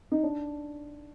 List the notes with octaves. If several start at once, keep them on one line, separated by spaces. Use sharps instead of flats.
D#4
D4